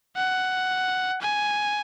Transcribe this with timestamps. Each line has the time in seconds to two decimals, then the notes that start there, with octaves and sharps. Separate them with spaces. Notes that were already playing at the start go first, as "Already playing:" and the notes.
0.17 F#5
1.21 G#5